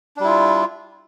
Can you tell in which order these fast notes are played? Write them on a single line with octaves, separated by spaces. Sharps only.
D4 G3 E4 F4